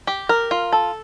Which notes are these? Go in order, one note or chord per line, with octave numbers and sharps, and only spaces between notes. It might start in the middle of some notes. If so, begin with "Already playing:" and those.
G4
A#4
F4
A4